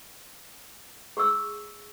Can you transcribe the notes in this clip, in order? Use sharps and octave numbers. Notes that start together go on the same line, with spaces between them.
G#4 C#6 D6 E6